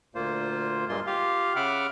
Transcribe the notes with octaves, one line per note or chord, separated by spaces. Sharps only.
D2 A#2 A#3 F4 C5
G2 A#2 G#3 A#3 F4 C6
F4 G4 F5
C#3 E5 F#5 B5 D6 F6